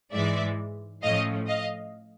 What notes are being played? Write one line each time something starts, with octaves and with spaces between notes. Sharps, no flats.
G#2 E3 G#3 D5 E5
A2 F3 A3 C#4 D#5 F5
D#5 F5